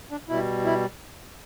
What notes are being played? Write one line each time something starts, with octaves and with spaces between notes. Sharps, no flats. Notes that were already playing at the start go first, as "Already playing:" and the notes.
D4
B2 G3 E4
E4